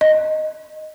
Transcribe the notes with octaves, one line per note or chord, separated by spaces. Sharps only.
D#5